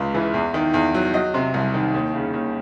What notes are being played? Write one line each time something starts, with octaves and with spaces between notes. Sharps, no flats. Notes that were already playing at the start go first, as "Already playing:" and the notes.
Already playing: C#2 C#3 G#3
E3
E2
D#3
E2
F#3
F#3 D#5
C3
C2
D#3
D#2
C#3
D#2